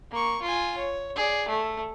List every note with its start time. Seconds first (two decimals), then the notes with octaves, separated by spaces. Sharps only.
0.12 A#3 C#6
0.42 F4 G#5
0.78 C#5
1.16 G#4 D5
1.49 A3